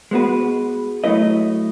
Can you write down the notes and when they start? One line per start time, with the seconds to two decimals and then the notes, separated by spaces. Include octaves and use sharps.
0.11 G#3 B3 F#4 B4
1.04 F#3 A3 E4 B4 D#5